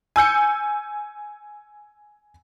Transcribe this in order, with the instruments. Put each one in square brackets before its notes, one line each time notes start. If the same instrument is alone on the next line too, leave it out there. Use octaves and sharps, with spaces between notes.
[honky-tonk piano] G#5 E6 G6 C#7